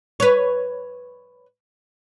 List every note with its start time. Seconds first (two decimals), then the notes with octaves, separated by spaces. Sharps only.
0.20 B4 C#5